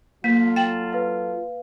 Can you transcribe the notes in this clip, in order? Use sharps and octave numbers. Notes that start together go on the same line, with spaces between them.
F#3 A#3 F4 A4 B6
G5 A6 E7 F#7
B4 F5